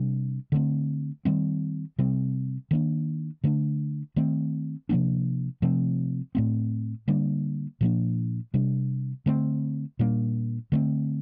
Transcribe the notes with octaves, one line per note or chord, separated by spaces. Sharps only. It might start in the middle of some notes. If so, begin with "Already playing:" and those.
Already playing: C3 G3 D4
D3 A3 C4
D#3 G3 C4
C3 G3 C4
D#3 A#3 D4
D3 A3 D4
D#3 A3 C4
C3 F3 A#3 D4
C3 F3 A3 C4
A2 A3 C4
D3 G3 A#3 D4
A#2 F3 A#3 D4
C3 G3 D4
D3 A3 C4
A#2 G3 A#3 D4
D3 A3 C4